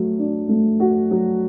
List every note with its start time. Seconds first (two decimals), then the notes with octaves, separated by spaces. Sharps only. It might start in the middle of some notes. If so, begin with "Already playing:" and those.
Already playing: F#3 A3
0.19 D4
0.49 A3
0.80 F#4
1.11 F#3